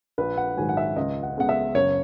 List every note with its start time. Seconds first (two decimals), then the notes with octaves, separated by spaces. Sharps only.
0.18 A#1 B4
0.37 F#5
0.57 G#2 D#3 F#3 G#5
0.69 F#5
0.77 E5
0.96 C#2 D#5
1.23 F#5
1.37 C#3 G#3 B3 F#5
1.49 E5
1.75 F#1 C#5